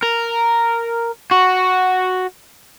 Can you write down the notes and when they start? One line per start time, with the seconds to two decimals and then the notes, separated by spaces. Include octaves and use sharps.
0.02 A#4
1.31 F#4